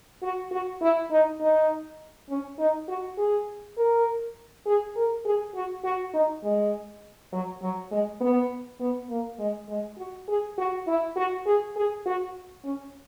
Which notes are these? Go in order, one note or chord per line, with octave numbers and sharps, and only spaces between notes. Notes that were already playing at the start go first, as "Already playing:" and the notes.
F#4
F#4
E4
D#4
D#4
C#4
D#4
F#4
G#4
A#4
G#4
A#4
G#4
F#4
F#4
D#4
G#3
F#3
F#3
G#3
B3
B3
A#3
G#3
G#3
F#4
G#4
F#4
E4
F#4
G#4
G#4
F#4
C#4